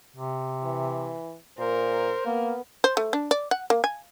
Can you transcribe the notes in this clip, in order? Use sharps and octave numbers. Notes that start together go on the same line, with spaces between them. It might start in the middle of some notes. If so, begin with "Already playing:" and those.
C3
E3
A#2 A#4 C5
A#3 B3
C5
A3
D4
D5
F#5
A#3
G#5